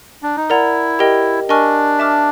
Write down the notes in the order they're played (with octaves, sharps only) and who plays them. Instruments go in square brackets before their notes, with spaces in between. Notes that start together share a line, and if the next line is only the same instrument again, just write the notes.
[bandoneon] D4
D#4
[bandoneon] E4 [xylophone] A#4 D5 F#5 A#5
[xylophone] G4 A#4 D#5 G5
[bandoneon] D4 [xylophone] A#4 D#5 G#5 C#6 F6
[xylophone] E5 A5 D6 F6